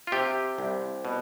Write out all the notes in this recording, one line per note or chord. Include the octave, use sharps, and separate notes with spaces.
F4
C3 G4
C2
B2